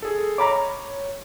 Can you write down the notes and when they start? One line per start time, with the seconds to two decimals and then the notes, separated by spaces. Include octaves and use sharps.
0.02 G#4 A4
0.38 C#5 A#5 B5 D6